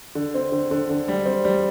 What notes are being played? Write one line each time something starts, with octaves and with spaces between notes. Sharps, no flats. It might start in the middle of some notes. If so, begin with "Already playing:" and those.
D3
C4
D3
D3
D3
G3
C4
G3